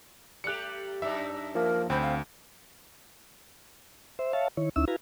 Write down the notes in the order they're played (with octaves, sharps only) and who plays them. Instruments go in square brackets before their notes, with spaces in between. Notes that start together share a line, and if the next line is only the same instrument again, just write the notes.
[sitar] G3 A3 G4 [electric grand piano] F#6 C#7
[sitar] F#2 D4 D#4 [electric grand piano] E5
[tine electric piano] F3 A#3 [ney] A#4
[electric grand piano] D2 B5 [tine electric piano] C4 [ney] C5
[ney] F5
[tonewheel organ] C5 E5
C#5 E5 F5 A5
D#3 E4 C#5
D2 C#4 D#4 E4 E5 E6
E4 F#4 B4 F5 G#5 A#5